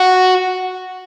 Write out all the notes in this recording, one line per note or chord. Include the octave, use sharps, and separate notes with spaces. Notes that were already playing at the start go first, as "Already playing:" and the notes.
Already playing: F#4